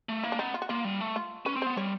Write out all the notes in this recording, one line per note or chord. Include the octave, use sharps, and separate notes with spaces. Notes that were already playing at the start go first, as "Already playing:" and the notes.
A3
A#3 E4
D4
B3 D#4
F4
F#4
A#3 F4
G3
A3
F4
C#4 B4
C4
B3 C5
G3 C#5